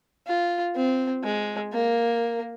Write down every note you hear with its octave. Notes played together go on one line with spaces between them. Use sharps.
F4
C4
G#3
A#3